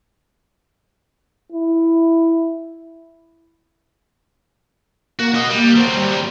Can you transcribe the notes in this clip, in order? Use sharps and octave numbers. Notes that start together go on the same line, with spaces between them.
E4
A#3 F#4
F#4 D#5
G3
F#3 C4
G3